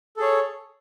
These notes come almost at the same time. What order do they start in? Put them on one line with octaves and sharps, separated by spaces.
A4 G#4 C#5